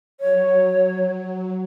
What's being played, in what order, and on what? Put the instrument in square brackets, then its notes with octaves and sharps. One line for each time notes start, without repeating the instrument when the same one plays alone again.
[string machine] F#3 [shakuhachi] C#5